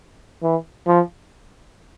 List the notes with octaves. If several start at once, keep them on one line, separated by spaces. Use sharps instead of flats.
E3
F3